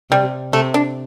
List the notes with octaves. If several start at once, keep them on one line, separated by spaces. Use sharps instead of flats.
C3 G3
C3 A3
D4